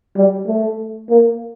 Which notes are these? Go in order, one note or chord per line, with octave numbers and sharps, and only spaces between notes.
G3
A3
A#3